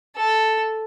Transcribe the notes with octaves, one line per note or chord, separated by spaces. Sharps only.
A4